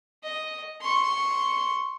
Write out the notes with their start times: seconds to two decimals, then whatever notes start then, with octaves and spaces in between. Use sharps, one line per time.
0.24 D#5
0.81 C6 C#6